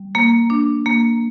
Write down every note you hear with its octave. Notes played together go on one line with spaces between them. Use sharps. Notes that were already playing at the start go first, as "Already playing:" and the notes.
Already playing: G3
A#3
D4
A#3